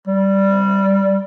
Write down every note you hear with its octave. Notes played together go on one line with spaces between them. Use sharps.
G3